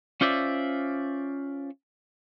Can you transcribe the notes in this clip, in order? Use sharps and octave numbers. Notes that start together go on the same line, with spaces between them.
C#4 F4 C5 D5 E5